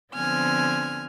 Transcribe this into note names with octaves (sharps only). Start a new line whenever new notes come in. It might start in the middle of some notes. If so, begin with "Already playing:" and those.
D3 F3 B3 C4 G#5 F6